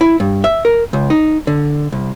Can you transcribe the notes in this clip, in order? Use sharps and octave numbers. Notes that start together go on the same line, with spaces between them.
E4
G2
E5
A#4
C#2
D#4
D3
C2